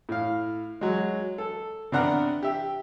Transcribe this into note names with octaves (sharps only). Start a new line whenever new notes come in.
A2 F5
F#3 G#3
A4
C3 B3 D4 F#5 A#5 F6
G4 E5